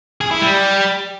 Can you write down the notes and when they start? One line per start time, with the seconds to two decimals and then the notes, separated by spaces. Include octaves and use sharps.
0.21 G#4
0.31 E4
0.41 G3